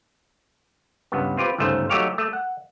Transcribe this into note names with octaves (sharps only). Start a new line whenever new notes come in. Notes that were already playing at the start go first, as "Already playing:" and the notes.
C#2 G2 B3
C4 F4 G4 B4
G1 C#2 G#2 A3 C5
F#3 A3 D#4 G4 C#5 F5
A3
F#5